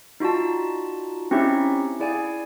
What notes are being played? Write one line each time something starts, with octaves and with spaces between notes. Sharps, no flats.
D#4 F4 F#4 D5 A5
C4 C#4 D#4 E4 G4 E5
E4 G#4 D5 F5 G#5